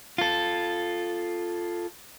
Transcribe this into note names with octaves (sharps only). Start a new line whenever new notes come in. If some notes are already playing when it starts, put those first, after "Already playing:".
F4 A4